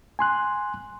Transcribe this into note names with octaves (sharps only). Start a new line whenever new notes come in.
G#5 C6 F#6